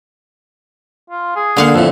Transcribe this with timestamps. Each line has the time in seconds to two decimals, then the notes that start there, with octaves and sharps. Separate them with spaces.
1.10 F4
1.36 G#4
1.57 D3 A#3 F5 F#5
1.74 F2 A2 A4